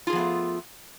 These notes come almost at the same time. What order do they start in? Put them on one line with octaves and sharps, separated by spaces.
F4 G#4 F3 B3 A3